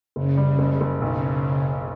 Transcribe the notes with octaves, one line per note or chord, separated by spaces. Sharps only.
F#1 C#3
G3
F#1
F#1
B1 C#3